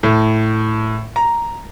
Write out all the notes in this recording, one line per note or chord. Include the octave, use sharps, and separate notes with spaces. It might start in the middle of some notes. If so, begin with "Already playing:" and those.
A2
A#5